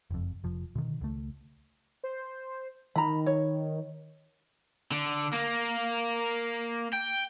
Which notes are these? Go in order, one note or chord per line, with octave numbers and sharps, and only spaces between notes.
F#1 F2
F1 F3
B2 D3 D#3
C#2 A3
C5
D#3 A#5 B5
C#5
D3
A#3
G5